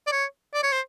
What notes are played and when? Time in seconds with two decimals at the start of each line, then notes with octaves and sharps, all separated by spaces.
0.07 D5
0.12 C#5
0.54 D5
0.63 C#5
0.72 C5